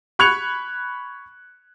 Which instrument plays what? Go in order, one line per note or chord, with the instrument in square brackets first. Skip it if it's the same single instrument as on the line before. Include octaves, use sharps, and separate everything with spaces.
[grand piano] B5 C#6 F#6 G#6 C#7 F7